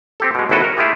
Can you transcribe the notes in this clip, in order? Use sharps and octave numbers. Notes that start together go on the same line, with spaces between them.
C4 G4 A4
B2 G#3
G#1 D#2 E4 F#4 A4 B4
A#4
A3 E4 F4 G4 G#4